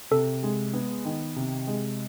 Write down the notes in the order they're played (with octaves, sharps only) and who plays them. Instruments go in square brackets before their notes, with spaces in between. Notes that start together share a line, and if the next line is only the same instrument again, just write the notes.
[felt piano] C3 [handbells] A4
[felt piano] G#3
B3
D#3
C3
G#3